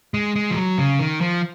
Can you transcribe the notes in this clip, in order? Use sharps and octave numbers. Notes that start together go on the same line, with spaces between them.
G#3
G#3
F3
F#3
C#3
D#3
F3